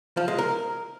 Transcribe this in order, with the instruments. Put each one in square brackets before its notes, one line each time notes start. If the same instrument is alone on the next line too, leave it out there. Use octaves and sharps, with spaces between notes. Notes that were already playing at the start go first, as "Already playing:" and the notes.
[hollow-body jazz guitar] F3
G#3
A#4